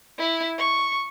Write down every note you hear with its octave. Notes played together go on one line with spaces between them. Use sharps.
E4
C#6